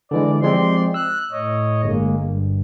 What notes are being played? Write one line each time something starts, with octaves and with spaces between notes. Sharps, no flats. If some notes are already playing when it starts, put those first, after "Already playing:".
D3 E3 G#3 D5
F3 G#3 C4 G4 D5 C6
E6 F#6
A2 C#5 D#5
G1 G#3 A#3
G2